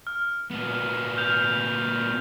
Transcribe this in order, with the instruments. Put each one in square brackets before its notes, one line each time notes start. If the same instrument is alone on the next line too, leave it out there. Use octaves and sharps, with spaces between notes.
[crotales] F6
[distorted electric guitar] A#2 B3
[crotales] F6 G6 F7